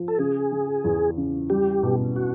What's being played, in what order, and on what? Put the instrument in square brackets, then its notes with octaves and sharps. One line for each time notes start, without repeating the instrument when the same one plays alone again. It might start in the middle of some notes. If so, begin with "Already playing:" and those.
Already playing: [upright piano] F3
[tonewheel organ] A4
[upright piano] C#3 [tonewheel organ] G#4
[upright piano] C#3
E2
C#3
[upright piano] G3 [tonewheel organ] G4
[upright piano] B2
[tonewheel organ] F#4